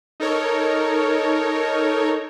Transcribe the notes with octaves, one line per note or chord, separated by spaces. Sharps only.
D#4 A4 A#4 C#5